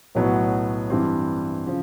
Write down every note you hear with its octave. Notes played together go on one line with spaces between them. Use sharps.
B1 A2 F#3 B3
G2 E3 G3 C4
C#3 F3